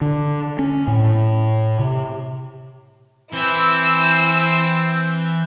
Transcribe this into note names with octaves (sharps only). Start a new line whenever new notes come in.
D3
C#4
A2
C3
E3 C4 E4 E6